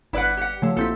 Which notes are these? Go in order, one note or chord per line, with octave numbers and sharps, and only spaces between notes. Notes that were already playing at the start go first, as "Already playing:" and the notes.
G1 E4 B4 D5 F#5
G4 F#5
C#3 F3 A3
A#1 C4 E4 A4